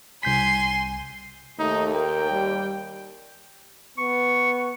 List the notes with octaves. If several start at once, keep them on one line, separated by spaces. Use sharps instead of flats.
C2 G#5 C6 G6 B6
D#2 A3 D#4
A#4 G5
G3
B3 C#6